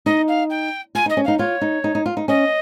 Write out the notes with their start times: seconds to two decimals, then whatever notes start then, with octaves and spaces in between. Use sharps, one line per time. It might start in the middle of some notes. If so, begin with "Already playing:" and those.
0.06 D#4 D#5
0.28 F5
0.50 G5
0.95 F4 G#5
1.06 D#4
1.10 D#5
1.17 C#4
1.24 D#4 F5
1.39 F4 C#5
1.61 D#4
1.84 D#4
1.95 D#4
2.06 F4
2.17 D#4
2.28 C#4 D#5